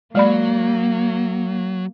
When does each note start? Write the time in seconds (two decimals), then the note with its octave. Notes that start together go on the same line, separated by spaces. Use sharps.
0.15 F#3 G#3 A#3 D5 B5